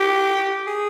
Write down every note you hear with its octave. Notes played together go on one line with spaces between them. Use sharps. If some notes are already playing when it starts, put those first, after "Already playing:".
Already playing: G4
G#4